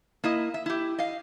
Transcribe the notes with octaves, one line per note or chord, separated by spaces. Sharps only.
A#3 E4 D#5
E5
E4 G4
D#5 F5